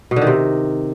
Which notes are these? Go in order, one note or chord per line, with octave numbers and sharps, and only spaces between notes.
B2
D3
D#3
C3